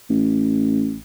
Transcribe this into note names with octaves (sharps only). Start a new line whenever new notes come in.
A1